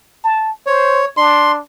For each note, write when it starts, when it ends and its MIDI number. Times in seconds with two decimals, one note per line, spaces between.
0.24 0.51 81
0.67 1.02 72
0.67 1.05 73
1.17 1.60 62
1.17 1.52 84